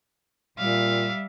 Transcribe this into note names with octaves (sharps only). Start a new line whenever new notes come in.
A#2 G3 E5 F5